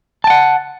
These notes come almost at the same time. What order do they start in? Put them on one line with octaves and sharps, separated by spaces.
A5 G5 F#5